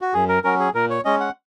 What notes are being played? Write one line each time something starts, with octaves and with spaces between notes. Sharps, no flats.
F#4
F#2 G#4
A#4
F#3 C#4 A#4
G#4
A#2 A#4
C#5
G#3 C#4 D#5
F#5